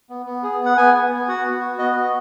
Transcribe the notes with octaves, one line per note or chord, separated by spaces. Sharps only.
B3
B3
G#4
B3
F#5
B3 G#5
B3
B3
F#4 F#5
B3
F#4
B3 D#5
F#4